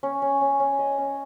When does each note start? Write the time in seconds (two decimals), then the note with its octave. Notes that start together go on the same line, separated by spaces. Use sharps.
0.03 C#4
0.22 C#4
0.41 C#4
0.60 C#4
0.79 D#5
0.98 C#4